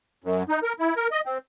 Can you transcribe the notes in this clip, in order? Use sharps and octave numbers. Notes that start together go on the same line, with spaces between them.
F#2
D#4
A#4
E4
A#4
D#5
C4